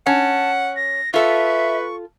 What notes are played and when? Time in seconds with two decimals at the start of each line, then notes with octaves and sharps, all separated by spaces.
0.07 C#4 F#5 A5
0.76 A#6
1.14 F4 A4 B4 E5 C#6